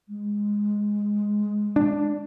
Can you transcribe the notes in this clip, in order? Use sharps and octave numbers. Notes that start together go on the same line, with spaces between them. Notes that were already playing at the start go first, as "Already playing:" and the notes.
G#3
D4